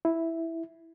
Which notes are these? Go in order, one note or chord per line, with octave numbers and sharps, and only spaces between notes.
E4